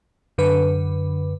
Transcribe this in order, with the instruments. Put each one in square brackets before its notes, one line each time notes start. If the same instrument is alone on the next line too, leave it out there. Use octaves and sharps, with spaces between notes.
[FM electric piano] F#2 D3 B4